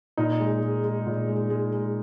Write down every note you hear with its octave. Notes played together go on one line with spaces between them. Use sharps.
A#2 D#4
G#3
G#3
G#3
A#2
G#3
G#3
G#3